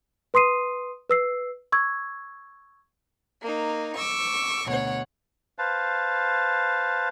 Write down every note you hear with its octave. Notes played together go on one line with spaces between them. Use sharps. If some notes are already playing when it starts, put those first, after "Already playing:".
B4 C6 D#6 C7 D#7
B4 E6 C7
C#6 E6 G#6
A#3 D#4
C#6 D6 E6
D2 B2 C#5 F#5
B4 C5 F5 A5